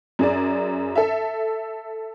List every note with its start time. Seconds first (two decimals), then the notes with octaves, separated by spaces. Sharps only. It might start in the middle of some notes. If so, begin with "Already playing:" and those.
0.19 F#2 G#4 D5
0.96 A4 E5